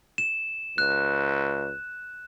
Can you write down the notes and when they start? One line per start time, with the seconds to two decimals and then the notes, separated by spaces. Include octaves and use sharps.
0.18 E7
0.78 C#2 F#6